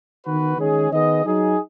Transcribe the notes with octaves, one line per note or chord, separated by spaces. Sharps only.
D#3 B3 F#4 B4
D#3 G#3 C#4 G#4
D#3 B3 G#4 D#5
F#3 D#4 G#4